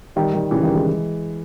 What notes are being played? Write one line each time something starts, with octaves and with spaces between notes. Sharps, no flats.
D#3 G3
D#3 G3
C#3 E3
D#3 G3
E3 G#3